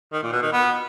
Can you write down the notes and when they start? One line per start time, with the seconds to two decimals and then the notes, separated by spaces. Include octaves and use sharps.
0.12 D#3
0.22 A#2
0.32 B2
0.42 D#3
0.52 B3